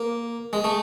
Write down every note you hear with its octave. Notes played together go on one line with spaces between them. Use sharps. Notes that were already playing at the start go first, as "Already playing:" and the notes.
Already playing: A#3
G#3
A3